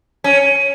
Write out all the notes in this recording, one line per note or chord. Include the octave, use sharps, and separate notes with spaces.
C#4